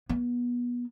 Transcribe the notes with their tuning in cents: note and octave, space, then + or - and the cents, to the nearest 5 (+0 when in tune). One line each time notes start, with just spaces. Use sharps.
B3 -25